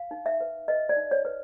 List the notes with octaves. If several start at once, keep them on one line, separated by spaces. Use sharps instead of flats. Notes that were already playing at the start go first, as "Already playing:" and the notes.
Already playing: F5
D#4
E5
B4
B4 D#5
D5
D#4
C#5
B4